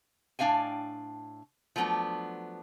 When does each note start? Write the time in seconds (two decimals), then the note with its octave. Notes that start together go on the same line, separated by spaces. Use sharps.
0.39 A2 D4 F5 G5 G#5
1.76 F3 F#3 A3 B3 D4